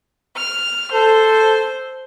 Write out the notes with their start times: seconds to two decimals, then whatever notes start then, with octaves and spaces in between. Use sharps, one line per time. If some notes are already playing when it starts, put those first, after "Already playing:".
0.37 F6
0.94 A4 C5